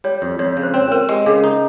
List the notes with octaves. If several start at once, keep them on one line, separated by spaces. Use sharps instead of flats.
G3 C#5
F2
F2 C#5
C#3
C5
C4 C#5
C4 A#4
G#3 G4
C#3 G#4
D#4